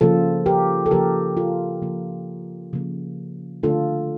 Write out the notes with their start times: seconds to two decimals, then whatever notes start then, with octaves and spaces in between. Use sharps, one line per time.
0.01 C#3 F3 A#3 F4 A4
0.46 G4 A#4
0.86 A4
0.91 C#3 F3 A#3 G4 A#4
1.37 F4 A4
1.82 C#3 F3 A#3
2.73 C#3 F3 A#3
3.63 D3 A3 D4 F4 A4